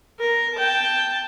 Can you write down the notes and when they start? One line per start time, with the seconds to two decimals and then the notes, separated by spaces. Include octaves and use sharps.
0.20 A#4
0.56 G5 A5